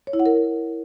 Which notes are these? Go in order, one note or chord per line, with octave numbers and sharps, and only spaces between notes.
C#5
E4
F#5
A#4